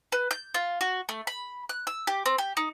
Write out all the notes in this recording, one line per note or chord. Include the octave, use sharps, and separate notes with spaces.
B4
G6
F4
F#4
A3
B5
F#6
E6
G4
C4
G4
D#4